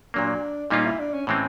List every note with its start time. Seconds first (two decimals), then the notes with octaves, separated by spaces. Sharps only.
0.14 A#2 F#3 A#3 D4
0.70 A#2 G3 A#3 C#4 D#4 F4
0.85 E4
0.99 D4
1.13 C#4
1.27 A2 E3 G#3 C4 C#4